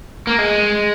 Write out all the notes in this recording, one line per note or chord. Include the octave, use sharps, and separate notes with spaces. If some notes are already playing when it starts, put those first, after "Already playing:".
A#3
G#3